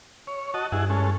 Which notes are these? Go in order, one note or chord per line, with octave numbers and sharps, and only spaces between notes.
C#5
F#4 D#5 A5
G2 E4 G#4 F#5
G#3 C#4 A4